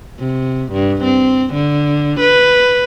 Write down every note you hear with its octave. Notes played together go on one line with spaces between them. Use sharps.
C3
G2
C4
D3
B4